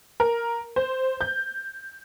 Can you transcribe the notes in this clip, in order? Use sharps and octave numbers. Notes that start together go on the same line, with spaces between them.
A#4
C5
G6